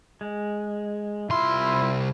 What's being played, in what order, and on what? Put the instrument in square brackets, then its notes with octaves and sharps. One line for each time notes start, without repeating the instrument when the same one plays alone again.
[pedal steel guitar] G#3
[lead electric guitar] C2 C6 [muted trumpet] E4 [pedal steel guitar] F4